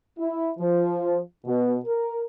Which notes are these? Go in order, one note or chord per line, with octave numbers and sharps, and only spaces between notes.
E4
F3
B2
A#4